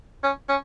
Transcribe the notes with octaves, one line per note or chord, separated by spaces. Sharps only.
C#4
C#4